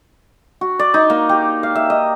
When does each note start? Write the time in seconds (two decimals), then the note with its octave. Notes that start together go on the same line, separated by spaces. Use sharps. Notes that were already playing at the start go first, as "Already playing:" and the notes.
0.61 F#4
0.79 D5
0.94 D#4
1.10 A#3
1.29 G4
1.63 F5
1.75 E5
1.90 D#5